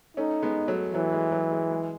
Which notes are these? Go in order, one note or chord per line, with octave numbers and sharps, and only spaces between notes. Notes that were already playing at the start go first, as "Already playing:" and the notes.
A3 C#4 D#4
G#3 B3
F#3 A3
E3 F#3 A3
G#3
F#3
G#3
G#3